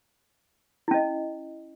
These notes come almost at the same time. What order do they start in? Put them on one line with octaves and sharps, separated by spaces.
E4 C#4 D#5